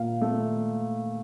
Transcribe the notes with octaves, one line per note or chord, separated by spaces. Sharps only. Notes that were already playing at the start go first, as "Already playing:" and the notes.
Already playing: A#2 F5
A3